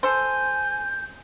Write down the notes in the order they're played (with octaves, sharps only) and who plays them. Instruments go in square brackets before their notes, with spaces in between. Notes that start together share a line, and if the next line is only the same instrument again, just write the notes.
[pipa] A4 C5 [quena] G#5 [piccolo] G6